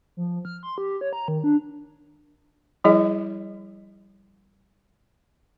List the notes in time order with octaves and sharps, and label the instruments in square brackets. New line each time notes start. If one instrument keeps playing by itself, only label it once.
[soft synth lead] F3
F6
C6
G4
C#5
A#5
D#3
D4
[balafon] F3 G3 E4 G#4 D#5